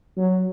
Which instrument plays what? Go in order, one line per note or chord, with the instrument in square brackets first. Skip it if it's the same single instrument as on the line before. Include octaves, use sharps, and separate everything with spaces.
[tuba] F#3